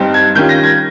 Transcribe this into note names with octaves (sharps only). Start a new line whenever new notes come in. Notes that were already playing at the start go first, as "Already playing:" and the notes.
Already playing: G2 G3 C4 D#4
G#6
D#3 G3 C#4 F4 G6
A#6
G#6